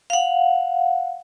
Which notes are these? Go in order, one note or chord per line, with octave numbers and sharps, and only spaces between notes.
F5 F#5